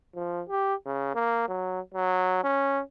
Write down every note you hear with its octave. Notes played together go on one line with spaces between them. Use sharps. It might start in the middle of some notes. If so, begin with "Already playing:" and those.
F3
G4
C#3
A#3
F#3
F#3
C#4